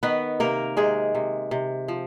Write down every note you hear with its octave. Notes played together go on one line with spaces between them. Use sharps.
D#3 B3 B4
C3 A#3 A#4
C3 G#3 G#4
C3
C3
F3